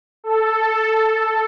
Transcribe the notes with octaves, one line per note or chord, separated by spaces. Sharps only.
A4